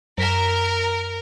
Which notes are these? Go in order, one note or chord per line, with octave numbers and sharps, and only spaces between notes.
F#2 A#4 B6 E7